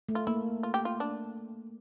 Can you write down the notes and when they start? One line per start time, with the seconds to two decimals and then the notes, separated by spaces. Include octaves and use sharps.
0.09 A3
0.15 F4
0.27 A#3 E4
0.63 F4
0.74 G4
0.85 F4
1.00 D4